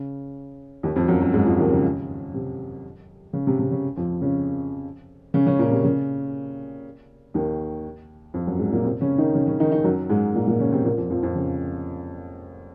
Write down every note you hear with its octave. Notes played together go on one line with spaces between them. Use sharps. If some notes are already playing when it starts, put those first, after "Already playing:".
Already playing: C#3
D#2 D#3
F2 F3
F#2 F#3
F#2 F#3
G#2 G#3
F2 F3
D#2 D#3
C#3
C3
C#3
C3
C3
C#3
F2 F3
C#3 C#4
C#3 C#4
C#3 C#4
A#2 A#3
C3
C#3
D#2 D#3
F2 F3
F#2 F#3
G#2 G#3
A#2 A#3
C3 C4
C#3 C#4
D#3 D#4
C#3 C#4
C#3 C#4
D#3 D#4
D#3 D#4
F#2 F#3
G#2 G#3
A#2 A#3
A#2 A#3
C#3 C#4
C3 C4
A#2 A#3
F2 F3
F2 F3
F2 F3
C#3